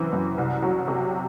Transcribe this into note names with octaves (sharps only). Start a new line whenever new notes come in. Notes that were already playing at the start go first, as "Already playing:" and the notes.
Already playing: F#2 E3 C4
F#2
C2
F#3
C3